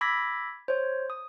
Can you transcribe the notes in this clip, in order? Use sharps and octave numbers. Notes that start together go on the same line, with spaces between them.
B5 D6 E6 G#6 A#6 B6
C5 C#5
D#6